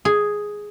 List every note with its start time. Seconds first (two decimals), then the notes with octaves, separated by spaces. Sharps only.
0.05 G#4